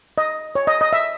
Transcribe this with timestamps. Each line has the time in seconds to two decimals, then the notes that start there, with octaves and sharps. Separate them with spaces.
0.18 D#5
0.55 C#5
0.67 D#5
0.81 D#5
0.93 E5